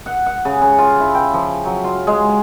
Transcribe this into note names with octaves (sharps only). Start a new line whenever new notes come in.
F#5
F#5
C#3
C#3
F4
E4
G5
F3
F#3
F4
G#3